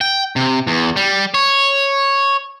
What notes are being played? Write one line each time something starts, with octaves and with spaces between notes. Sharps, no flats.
G5
C3
E2
G3
C#5